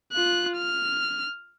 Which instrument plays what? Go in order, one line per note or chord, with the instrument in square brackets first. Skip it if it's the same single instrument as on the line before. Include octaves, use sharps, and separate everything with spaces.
[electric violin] F4 F#6
F6